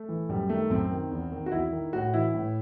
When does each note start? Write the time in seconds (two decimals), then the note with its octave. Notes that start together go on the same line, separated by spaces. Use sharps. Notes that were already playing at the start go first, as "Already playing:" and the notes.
Already playing: A3
0.09 E3
0.29 F#2 G3
0.49 D#3 A3
0.70 F#2 C4
0.91 D#3
1.11 E2
1.32 D#3
1.46 F#4
1.52 E2 E4
1.72 D#3
1.93 A2 F#4
2.14 E3 E4
2.34 A2